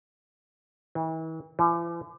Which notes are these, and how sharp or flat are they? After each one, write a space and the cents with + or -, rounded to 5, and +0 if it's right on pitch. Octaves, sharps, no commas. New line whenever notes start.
E3 -40
E3 +45